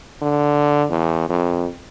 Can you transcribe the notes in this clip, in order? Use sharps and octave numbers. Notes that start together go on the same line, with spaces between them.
D3
E2
F2